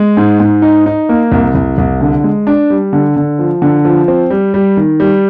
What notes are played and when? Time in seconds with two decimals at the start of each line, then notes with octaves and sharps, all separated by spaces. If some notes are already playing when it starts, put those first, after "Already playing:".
Already playing: G#3
0.17 G#2
0.40 G#2
0.62 D#4
0.86 D#4
1.09 A#3
1.32 C2
1.55 C2
1.78 C2
2.01 D3
2.24 G#3
2.47 D4
2.70 G3
2.93 D3
3.16 D3
3.39 F3
3.62 D3
3.85 F3
4.08 C4
4.31 G3
4.54 G3
4.77 D#3
5.00 G3